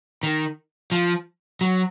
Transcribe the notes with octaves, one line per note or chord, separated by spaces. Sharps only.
D#3
F3
F#3